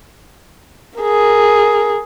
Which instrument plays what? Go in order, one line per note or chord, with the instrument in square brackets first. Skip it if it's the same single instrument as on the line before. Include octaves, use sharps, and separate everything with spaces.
[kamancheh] G#4 A#4